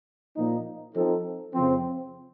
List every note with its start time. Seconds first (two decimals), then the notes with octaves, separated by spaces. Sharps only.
0.37 A#2 F3 A#3 D#4
0.95 F3 C4 D#4 A4
1.54 F2 C#3 F3 C4